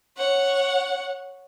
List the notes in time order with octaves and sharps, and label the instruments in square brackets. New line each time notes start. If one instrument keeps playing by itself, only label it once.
[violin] C#5 F#5